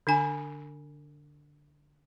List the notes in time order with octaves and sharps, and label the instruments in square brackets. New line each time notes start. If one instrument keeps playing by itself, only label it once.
[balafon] D3 D4 G#5